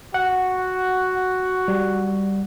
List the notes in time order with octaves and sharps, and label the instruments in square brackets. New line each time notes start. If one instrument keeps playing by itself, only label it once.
[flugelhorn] F#4 [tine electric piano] F#5
[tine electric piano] G3